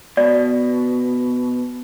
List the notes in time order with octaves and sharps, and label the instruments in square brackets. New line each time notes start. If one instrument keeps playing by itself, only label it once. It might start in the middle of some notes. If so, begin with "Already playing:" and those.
[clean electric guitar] B2 [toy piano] D5